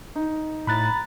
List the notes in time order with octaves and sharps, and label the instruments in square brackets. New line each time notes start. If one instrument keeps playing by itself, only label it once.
[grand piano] D#4
[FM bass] A2 [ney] A#5 [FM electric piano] B5 F#6 A6